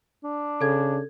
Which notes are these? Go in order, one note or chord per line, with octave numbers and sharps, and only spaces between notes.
D4
C#3 A4 G#6